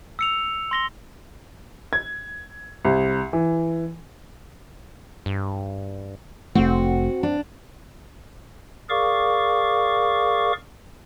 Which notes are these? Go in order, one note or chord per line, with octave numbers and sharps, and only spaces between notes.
E6 C#7 F7
C6 A#6 G7
G#6
C2
E3
G2
F1 A3 C4 F#4
D4
G#4 A#4 D5 F5 C#6 D6